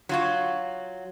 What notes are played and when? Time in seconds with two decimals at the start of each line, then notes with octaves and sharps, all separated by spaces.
0.09 F#3 F4 F#4